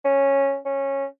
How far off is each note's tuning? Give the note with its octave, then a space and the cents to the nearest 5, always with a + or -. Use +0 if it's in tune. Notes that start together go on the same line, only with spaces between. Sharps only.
C#4 -10
C#4 -15